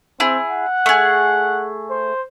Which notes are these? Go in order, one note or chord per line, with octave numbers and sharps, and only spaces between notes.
C4 E4 G#4
F#5
A3 G#4
C5